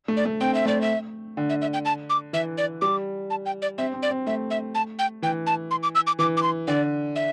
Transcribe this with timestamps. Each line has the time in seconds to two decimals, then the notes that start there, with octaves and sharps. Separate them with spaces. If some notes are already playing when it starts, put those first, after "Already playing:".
0.08 A3
0.17 D5
0.25 A3
0.41 C4 G5
0.54 E5
0.65 A3 D5
0.81 E5
1.37 D3
1.50 E5
1.62 E5
1.73 G5
1.85 A5
2.10 D6
2.33 E3 E5
2.58 D5
2.81 G3 D6
3.30 A5
3.46 G5
3.62 D5
3.78 C4 E5
3.94 C4
4.03 D5
4.11 C4
4.27 A3 E5
4.51 E5
4.75 A5
4.99 G5
5.22 E3 G5
5.47 A5
5.71 C6
5.83 D6
5.95 E6
6.07 D6
6.19 E3 D6
6.37 D6
6.43 C6
6.67 D3 D5
7.16 E5